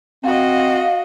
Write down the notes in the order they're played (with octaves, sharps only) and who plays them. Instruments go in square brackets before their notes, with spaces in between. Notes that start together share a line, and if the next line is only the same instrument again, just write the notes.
[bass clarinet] C4 [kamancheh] F#4 D#5 [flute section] F5